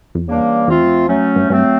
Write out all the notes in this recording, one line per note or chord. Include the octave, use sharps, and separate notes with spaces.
F2
E2 C#3 E3 G3 A#3 D4
E2 F3 A3 C4 F4
F#2
F2
E2
F2 F#3 A3 C#4
G2
G2 F#3 A3 C4